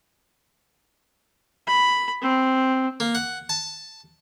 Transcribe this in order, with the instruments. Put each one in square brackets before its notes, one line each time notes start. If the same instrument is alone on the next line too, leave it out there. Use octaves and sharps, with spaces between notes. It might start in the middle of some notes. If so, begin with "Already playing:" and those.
[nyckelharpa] B5
C4
[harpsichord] A#3
F#5
A5